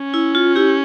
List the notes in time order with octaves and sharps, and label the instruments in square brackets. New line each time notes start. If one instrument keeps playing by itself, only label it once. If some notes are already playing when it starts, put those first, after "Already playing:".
Already playing: [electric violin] C#4
[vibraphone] E4
F4
E4 G4